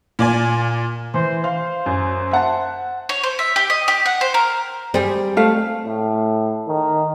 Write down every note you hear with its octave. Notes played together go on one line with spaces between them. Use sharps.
A#2 D5 G#5
E3 C5
C5 F5
F#2
E5 F#5 A5
C#5
C5
E5
G4
D#5
G4
F#5
C5
A#4
G3 C4 G#4
A3 F5
A2
D#3